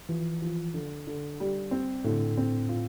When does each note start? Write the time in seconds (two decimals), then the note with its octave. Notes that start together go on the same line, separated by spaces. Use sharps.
0.09 E3 F3
0.42 F3
0.74 D3
1.07 D3
1.40 G3
1.71 C4
2.04 A2 D3
2.37 C4
2.69 F4